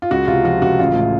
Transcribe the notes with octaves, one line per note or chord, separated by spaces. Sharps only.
F4
C#2 F#4
C3 F4
F3 F#4
C#2 F#4
A1 F4
A2